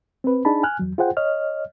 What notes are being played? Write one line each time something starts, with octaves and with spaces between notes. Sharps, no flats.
C4 B4
D4 D#4 G#4 A5 B5
G#5 F6 F#6
E2 F#3
F4 G#4 C5 F#5 G5
C#5 D#5 F6